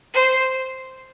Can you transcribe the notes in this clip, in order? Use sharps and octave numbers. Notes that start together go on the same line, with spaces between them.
C5